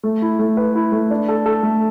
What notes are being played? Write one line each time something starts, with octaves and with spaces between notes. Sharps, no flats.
A3
E4
A3
B4
E4
A3
D4
A4
A4
A3